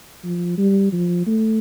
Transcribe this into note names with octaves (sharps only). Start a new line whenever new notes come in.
F3
G3
F3
A3